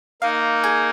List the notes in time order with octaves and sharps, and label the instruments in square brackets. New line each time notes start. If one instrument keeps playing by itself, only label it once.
[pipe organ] A#3 D#4 [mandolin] F5
[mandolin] G#4